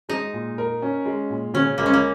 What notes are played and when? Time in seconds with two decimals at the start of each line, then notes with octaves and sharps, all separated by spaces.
0.09 G#3 D#4
0.33 A#2
0.58 A#4
0.82 C#4
1.06 G#3
1.30 A#2
1.54 C#3 C#4
1.78 C#2 A#3
1.86 C#4
1.93 A#3